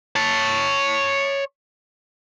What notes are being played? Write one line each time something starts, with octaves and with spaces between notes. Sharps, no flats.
C#5 A5